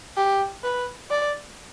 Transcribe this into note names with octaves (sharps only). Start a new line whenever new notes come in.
G4
B4
D5